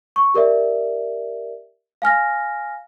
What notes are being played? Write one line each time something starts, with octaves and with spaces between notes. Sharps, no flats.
C#6
G4 A#4 D5 E5
F5 G#5 F6 A#6